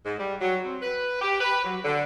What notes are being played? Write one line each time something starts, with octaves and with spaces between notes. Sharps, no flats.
G#2
G3
F#3
C4
B4
G4
B4
F#3
D3